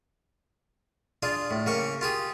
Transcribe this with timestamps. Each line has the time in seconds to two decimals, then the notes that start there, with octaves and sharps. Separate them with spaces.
1.23 D4 F4 G#4
1.51 A2
1.66 C#3 A#3 C#6
2.01 F4 G4 G#4